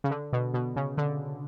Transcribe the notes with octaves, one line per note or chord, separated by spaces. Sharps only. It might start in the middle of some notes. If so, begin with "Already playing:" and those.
C#3
D3
B2
B2
C#3
D3